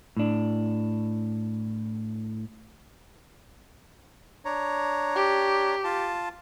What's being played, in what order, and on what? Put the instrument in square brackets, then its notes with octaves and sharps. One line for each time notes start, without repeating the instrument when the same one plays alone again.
[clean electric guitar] A2 D4
[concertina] D4 C#5 A#5
[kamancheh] G4
[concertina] F4 A5